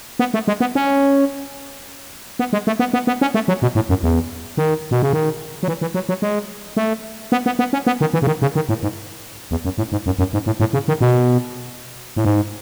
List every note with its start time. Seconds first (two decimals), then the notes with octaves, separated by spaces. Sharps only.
0.19 B3
0.34 A3
0.48 G#3
0.60 B3
0.75 C#4
2.39 B3
2.53 G#3
2.67 A3
2.79 B3
2.93 B3
3.07 B3
3.21 C#4
3.34 A3
3.48 F#3
3.62 B2
3.75 A2
3.89 F#2
4.03 E2
4.57 D#3
4.91 B2
5.02 C#3
5.13 D#3
5.63 F#3
5.68 E3
5.81 E3
5.94 F#3
6.09 F#3
6.22 G#3
6.77 A3
7.32 B3
7.46 B3
7.59 B3
7.73 C#4
7.87 B3
8.01 D#3
8.13 E3
8.22 C#3
8.27 D#3
8.42 C#3
8.55 D#3
8.69 A2
8.83 G#2
9.51 E2
9.65 F#2
9.78 A2
9.92 G#2
10.06 F#2
10.19 F#2
10.33 G#2
10.46 A2
10.60 A2
10.73 C#3
10.88 D#3
11.01 B2
12.16 A2
12.25 G#2